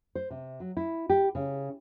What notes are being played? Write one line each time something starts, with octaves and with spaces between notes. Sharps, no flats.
C5
C3
F#3
E4
G4
C#3